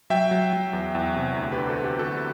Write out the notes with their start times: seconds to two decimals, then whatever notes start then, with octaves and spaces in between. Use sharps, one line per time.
0.10 F#3 E5 G5
0.31 F#3
0.53 F#3
0.73 E2
0.95 E2
1.16 C3
1.36 D2
1.52 G4 B4
1.57 D3
1.68 F#4 A4
1.78 D3
1.84 G4
1.99 D2 F#4 A4